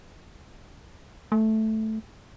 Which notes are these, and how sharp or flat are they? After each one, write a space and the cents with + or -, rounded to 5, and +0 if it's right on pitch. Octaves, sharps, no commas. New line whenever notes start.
A3 -5